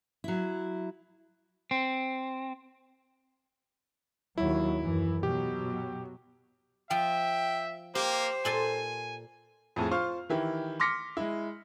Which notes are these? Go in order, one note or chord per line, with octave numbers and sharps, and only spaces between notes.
F#3 E4
C4
D#2 F#3 E4
F#2 E3
B2 F#3 G4
F3 E5 G5
A#3 G4 C5
A#2 A4 G#5 C6
F2 A2 G#4
F4 C5 F5 C#6 F6
D#3 E3 E4 G4
C6 D6 F6 A#6 B6 C#7
G#3 E4